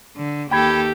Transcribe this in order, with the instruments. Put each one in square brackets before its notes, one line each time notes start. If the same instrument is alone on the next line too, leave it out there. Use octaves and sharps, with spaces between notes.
[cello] D3
[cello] D#2 A4 [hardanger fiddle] G4 [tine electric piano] G5 B5 G#6